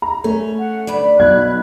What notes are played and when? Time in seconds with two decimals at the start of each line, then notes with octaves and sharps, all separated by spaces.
0.02 A#5
0.24 A3 C#4
0.58 F#5
0.87 D2 G2 D5 B5
1.19 B1 B5 F#6 G#6